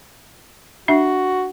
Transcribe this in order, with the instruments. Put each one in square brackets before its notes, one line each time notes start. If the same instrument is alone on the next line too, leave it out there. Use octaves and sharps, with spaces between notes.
[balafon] D4 E5 [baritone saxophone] F#4